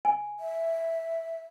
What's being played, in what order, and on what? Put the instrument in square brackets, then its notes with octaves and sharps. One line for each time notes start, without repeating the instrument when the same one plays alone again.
[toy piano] G#5
[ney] E5